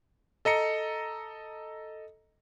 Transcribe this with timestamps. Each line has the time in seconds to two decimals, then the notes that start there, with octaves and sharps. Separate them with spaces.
0.45 A4 D#5 A#5 C#7